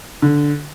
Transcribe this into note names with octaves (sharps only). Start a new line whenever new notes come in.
D3